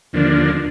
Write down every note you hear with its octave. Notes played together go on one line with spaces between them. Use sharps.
D#2 D3 F3 A#3 D4